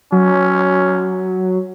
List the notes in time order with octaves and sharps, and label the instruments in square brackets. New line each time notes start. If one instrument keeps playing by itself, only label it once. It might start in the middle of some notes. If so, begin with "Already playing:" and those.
[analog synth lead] F#3 [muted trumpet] C#4